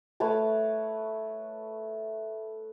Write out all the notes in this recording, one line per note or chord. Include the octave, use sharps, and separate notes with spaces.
A3 B4 C#5 A5